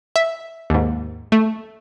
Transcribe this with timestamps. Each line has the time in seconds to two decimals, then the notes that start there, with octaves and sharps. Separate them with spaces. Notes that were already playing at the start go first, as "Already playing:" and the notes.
0.16 E5
0.70 D#2 G#2
1.32 A3